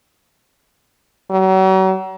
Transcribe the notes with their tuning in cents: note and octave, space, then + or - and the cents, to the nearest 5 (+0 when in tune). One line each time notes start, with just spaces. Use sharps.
F#3 +40